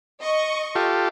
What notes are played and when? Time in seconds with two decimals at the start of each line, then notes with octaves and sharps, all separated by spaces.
0.21 D#5 C#6
0.75 F4 G4 A4